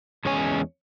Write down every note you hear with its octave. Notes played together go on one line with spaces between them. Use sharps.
E2 G#3 C#4 C#5 G#5